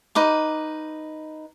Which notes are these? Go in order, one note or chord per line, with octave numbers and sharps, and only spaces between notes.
D#4 B4 D6